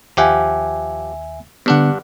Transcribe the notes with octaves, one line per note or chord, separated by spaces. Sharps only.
D#2 F3 G4 E5 F#5 G#5
G2 D3 B3 D4 F#5